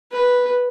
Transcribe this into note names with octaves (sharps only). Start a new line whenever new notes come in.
B4